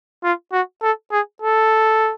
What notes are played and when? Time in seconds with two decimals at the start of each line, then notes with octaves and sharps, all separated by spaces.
0.24 F4
0.52 F#4
0.82 A4
1.12 G#4
1.42 A4